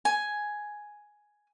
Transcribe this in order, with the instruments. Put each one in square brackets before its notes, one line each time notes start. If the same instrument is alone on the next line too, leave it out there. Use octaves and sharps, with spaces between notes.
[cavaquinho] G#5